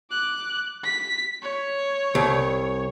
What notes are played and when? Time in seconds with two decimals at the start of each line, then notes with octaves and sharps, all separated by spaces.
0.11 D6 F#6
0.84 B6
1.42 C#5
2.15 C2